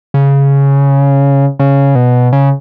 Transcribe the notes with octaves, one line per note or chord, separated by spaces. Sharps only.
C#3
C#3
B2
C#3